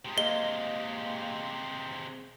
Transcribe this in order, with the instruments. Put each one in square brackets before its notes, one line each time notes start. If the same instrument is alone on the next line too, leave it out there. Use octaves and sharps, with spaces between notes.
[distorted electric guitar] C3 G#3
[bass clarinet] A#3 [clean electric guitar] D#5 [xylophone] G7